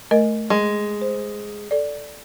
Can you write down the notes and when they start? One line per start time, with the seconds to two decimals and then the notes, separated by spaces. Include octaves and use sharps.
0.11 A3 A#4 D#5
0.50 G#3
1.02 C5
1.71 A4 D5